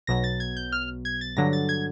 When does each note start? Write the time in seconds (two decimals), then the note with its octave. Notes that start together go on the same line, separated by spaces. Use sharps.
0.07 B1 B2 F#3 A#6
0.24 A6
0.40 G#6
0.57 G6
0.72 F6
1.05 G#6
1.21 A6
1.37 G2 D3 F#3 A#6
1.53 A6
1.69 G#6